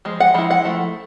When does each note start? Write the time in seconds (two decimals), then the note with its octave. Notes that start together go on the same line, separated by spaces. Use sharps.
0.05 F3 G#3
0.20 F#5
0.34 F3 G#3 E4
0.51 F#5
0.65 F3 A3